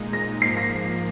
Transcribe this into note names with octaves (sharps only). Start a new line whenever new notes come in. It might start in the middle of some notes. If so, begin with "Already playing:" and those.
Already playing: A#2 G#3 D#4
A#6
G#2 F3 A#3 C7
A#6